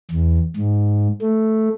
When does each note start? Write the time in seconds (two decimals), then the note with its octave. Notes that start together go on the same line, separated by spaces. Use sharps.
0.11 E2
0.56 G#2
1.22 A3